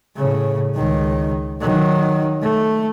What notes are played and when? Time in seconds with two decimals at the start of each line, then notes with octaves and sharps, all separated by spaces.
0.16 A2 C#3
0.75 C#2 D#3
1.61 D#3 F#3
2.42 A3